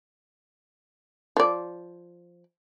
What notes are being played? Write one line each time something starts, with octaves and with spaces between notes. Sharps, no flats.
F3 D5